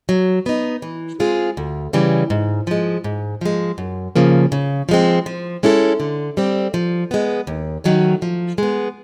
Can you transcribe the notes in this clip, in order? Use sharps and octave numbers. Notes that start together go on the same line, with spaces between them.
F#3
B3 D#4
E3
G#3 C4 F4 G#4
D2
C#3 E3 G3
G#2
F3 G#3
G#2
F3 G#3
F#2
C#3 F3 A#3
C#3
F3 G#3 C4
F3
G#3 C#4 E4 A4
D3
G3 C4
F3
G#3 B3
D#2
D#3 F#3 A3 C#4
F3
G#3 B3